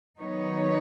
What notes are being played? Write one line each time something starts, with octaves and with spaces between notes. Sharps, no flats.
D#3 F#3 B3 D#4 C#5